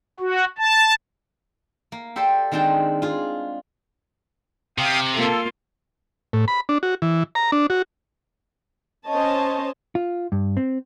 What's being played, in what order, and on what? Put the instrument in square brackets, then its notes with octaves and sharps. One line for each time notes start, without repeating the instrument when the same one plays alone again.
[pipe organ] F#4
A5
[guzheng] A#3
G4 A4 C5 D5 G5
D#3 G#3 C4 D4 G5 A5
F4 G#4
[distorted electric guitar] C3 [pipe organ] F5 G5 D#6
[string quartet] A#3 F4 [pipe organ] A4
[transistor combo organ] A2
B5
D4
F#4
E3
A#5
D4
F#4
[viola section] C#4 C5 C#5 D#5 A5
[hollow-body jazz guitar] F4
G2
C4